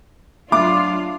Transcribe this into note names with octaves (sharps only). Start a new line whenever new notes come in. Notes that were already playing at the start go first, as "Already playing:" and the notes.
F#3 D4 F4 E5 D6